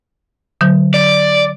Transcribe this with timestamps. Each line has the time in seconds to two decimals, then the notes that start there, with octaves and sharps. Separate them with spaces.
0.61 D3 F#3
0.94 D5